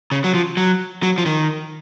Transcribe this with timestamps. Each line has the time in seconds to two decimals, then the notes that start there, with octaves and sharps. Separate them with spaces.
0.12 C#3
0.24 F#3
0.34 F3
0.57 F#3
1.03 F#3
1.18 F3
1.26 D#3